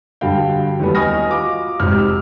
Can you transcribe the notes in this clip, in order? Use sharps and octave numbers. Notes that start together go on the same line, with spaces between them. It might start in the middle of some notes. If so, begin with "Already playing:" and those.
G2 D3 F#4 F5 G5
D#2 E3 G3 A3 B3
D#5 G#5 C#6 D#6 F6 A#6
F4 F#4 D6
F1 G#2 C3 F6
C2 E6